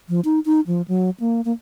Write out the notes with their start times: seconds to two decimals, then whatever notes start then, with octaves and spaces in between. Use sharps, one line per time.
0.09 F3
0.25 D#4
0.46 D#4
0.67 F3
0.88 F#3
1.20 A#3
1.45 A#3